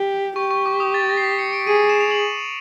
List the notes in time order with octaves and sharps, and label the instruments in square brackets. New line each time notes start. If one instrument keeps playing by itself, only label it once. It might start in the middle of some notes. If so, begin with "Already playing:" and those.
Already playing: [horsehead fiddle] G4
[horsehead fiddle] G4 [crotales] C#6
[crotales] C#6
D6
D#6
A6
A#6
C7
B6
C#7
D7
[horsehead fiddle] G#4 [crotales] D#7
[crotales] E7
F7
F#7